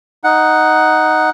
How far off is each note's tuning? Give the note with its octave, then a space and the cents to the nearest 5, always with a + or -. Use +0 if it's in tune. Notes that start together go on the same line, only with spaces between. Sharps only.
D#4 +0 F#5 +0